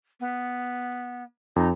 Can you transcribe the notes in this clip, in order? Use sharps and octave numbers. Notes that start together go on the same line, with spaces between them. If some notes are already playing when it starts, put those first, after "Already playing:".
B3
F2 D#4